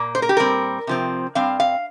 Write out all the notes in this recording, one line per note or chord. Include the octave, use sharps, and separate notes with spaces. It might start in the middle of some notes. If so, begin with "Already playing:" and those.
Already playing: A#2 A#3
C5
A#4
G4
A#2 G3 C4 A#4
C3 F3 C4
G2 G3 C4 F5
F5